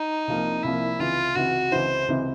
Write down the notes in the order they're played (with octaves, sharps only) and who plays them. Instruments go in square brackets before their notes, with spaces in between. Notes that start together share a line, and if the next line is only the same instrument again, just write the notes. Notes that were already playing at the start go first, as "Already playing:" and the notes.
Already playing: [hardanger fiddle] D#4
[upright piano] C2 C3 F3 A#3
[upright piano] C2 C3 F3 A#3 [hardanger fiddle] E4
[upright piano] C#2 C3 E3 [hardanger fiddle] F4
[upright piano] C#2 C3 E3 [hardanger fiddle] F#4
[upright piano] C#2 C3 E3 [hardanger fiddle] C5
[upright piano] C#2 C3 E3